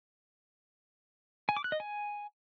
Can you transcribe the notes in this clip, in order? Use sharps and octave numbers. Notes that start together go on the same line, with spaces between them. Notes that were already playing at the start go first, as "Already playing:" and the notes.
G#5
D6
F#6
D#5
G#5